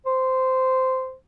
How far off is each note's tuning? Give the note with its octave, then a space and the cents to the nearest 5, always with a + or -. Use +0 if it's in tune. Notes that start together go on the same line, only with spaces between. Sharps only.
C5 -15